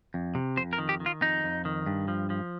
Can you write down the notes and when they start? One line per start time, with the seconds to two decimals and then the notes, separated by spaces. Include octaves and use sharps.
0.14 F2
0.35 C3
0.57 F2 C5
0.73 A#4
0.78 D#3
0.89 G4
1.00 D#3
1.06 F4
1.21 F2 D#4
1.44 F2
1.65 D#3
1.86 G2
2.08 F3
2.30 F3